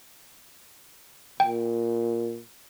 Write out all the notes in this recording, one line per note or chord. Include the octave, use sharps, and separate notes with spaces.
A#2 G5